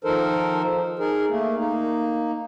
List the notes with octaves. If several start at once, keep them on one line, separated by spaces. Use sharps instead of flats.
D#3 F3 D#4 A4 A#4 C5
D#4 G#4 A#4
A3 A#3
A#3 D#4